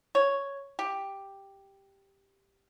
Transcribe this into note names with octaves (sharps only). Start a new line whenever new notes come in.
C#5
G4